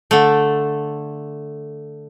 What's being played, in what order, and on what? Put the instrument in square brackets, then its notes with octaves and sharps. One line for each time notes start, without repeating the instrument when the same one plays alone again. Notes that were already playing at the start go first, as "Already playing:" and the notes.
[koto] D3 A3